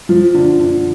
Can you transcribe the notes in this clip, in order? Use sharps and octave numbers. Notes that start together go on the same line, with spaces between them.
F3
D3
D3